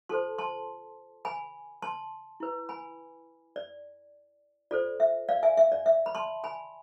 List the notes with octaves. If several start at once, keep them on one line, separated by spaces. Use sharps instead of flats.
F4 A4 C5 A5 C6
A5 C6
G#5 B5
A5 C6
E4 B4
G#5 B5
D5
F4 A4 C5 D5
E5
D5 F5
E5 G#5
E5
D5
E5
B5
A5 C6
G#5 B5